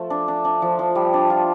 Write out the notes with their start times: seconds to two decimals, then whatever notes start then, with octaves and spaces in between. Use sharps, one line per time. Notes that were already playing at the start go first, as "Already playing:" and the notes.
Already playing: F3 A3
0.10 D4
0.28 D4
0.45 D4
0.62 F3
0.79 F3
0.95 G3
1.14 D4
1.30 F4